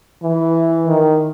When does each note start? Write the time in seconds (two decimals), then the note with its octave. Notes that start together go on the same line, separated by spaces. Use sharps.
0.23 E3
0.87 D#3